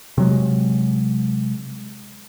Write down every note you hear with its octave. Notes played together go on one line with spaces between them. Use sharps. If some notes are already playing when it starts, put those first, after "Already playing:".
C3 F#3 G#3